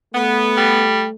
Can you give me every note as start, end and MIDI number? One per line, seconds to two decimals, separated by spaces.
0.14 1.14 57
0.14 0.81 59
0.57 1.05 55